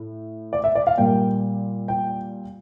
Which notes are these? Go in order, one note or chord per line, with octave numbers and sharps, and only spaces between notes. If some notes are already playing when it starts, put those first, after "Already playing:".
Already playing: A2
D5
E5
D5
F5
A#2 G3 A#3 G5
G5